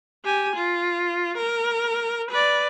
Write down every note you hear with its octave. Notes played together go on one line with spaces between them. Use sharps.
G4 G#5
F4
A#4
B4 D5